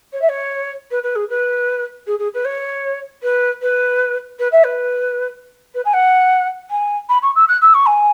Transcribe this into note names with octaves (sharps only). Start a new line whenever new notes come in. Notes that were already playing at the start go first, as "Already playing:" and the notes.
C#5
E5
C#5
B4
B4
G#4
B4
G#4
G#4
B4
C#5
B4
B4
B4
E5
B4
B4
G#5
F#5
G#5
B5
C#6
E6
F#6
E6
C#6
G#5